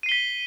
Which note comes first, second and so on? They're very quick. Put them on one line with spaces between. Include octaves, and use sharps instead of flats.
D#7 C7 G7 B6